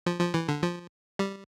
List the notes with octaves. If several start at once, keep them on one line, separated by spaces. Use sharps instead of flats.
F3
F3
E3
D3
F3
G3